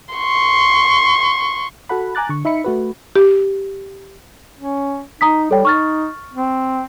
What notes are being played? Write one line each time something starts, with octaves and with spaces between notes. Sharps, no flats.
C6 C#6
F#4 A4 F#5 B5
G#5 A#5 D6 F#6 A6
D3 C#6
D#4 E5 B5 C#7
A3 F#4 B4
G4
C#4
D#4 A#5 D#6 B6
G3 A4 C#5 G5
D#4 C#6 F6 A6
C4